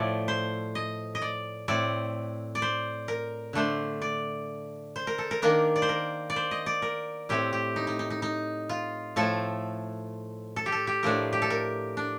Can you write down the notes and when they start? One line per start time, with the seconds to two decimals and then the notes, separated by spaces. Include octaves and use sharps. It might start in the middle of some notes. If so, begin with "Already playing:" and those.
Already playing: A2 F3 A3 D5
0.28 C5
0.75 D#5
1.15 D#5
1.22 D5
1.68 A2 A3 C4 D5
2.55 D5
2.62 C5
3.08 A#4
3.53 D3 A3 D4 C5
4.02 D5
4.96 C5
5.07 A#4
5.18 A4
5.31 A#4
5.42 D#3 A#3 D4 A#4
5.76 D5
5.82 C5
5.89 A#4
6.30 D5
6.36 C5
6.51 D#5
6.66 D5
6.82 A#4
7.29 A2 A3 C4 G4
7.53 G4
7.76 D#4
7.87 D#4
7.99 D#4
8.10 D#4
8.22 D#4
8.69 F4
9.16 A2 F3 A3 A4
10.56 A4
10.66 G4
10.72 A4
10.87 G4
11.03 A2 F3 A3 D4 A#4
11.33 G4
11.42 A4
11.50 A#4
11.97 D4